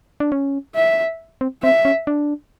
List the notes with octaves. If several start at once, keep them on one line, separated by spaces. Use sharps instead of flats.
D4
C#4
E5
C4
C4 E5
C#4
D4